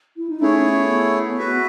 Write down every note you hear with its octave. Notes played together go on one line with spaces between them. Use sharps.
E4
D#4
A3 C#4 E4 G#4 C#5
B3
F#4 B4 E5